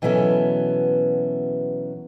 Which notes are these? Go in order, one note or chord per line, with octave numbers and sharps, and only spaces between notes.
B2 E3 F#3 B3 C#4 A4